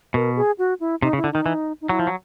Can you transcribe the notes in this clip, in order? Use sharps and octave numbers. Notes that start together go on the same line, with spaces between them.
B2 A#4
G#4
F#4
E4
C3 D#4
C#3
E4
D3
D#3 D#4
E3
D#4
F#3 E4
F3
F#3